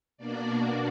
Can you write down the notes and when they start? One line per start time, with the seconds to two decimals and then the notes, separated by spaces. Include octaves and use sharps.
0.18 B2 A#3 D4 D5
0.47 F#4